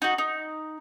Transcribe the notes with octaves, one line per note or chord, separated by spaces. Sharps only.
D#4 F#4
D#4